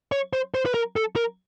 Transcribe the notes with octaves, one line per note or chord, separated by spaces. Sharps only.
C#5
C5
C5
B4
A#4
A4
A#4